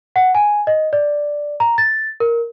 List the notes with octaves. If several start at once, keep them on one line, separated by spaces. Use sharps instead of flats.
F#5
G#5
D#5
D5
A#5
A6
A#4